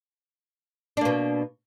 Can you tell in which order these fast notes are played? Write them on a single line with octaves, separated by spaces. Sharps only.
D4 A#3 B2